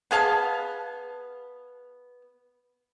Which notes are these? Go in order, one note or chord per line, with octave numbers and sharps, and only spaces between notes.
B3 G#4 F5 A5